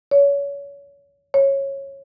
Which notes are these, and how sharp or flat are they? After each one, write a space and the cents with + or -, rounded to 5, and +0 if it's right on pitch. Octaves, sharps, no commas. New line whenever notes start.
C#5 +30
C#5 -15